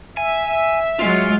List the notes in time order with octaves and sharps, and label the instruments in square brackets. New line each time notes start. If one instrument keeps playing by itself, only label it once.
[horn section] E5 [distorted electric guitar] G#5
[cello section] F#3 G#3 [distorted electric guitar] F4